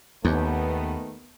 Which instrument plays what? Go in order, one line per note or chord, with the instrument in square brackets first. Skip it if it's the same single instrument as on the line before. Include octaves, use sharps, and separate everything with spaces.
[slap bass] D#2 [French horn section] D#3 A3 B3